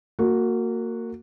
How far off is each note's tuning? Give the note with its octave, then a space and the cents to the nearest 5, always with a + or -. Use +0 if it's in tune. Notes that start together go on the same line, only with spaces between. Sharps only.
A#3 -25 F#4 -10